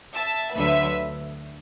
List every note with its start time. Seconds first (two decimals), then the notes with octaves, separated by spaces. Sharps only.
0.16 E5 A5
0.55 D2 D3 F#3 B4 E5